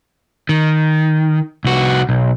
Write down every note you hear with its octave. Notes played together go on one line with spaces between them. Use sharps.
D#3
C2 F#4
B1